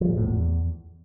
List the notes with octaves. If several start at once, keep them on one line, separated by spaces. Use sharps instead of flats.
F3
A#2
A2
E2